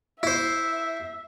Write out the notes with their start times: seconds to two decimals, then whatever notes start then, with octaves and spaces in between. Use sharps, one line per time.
0.23 E4 C5 E5